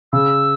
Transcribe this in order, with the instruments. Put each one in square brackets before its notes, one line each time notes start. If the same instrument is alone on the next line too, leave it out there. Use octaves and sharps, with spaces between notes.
[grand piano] C#3 [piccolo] E6